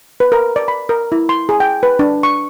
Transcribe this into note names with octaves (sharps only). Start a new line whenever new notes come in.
B4
A#4
D5
B5
A#4
E4
C6
G#4
G5
B4
D4
C#6